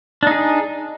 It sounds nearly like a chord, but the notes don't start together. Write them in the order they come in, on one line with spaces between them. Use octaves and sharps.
D4 D#4 G#4